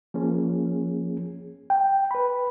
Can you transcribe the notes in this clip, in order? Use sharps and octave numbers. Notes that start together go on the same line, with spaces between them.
F3 A#3 C#4 G#4
G5
B4 B5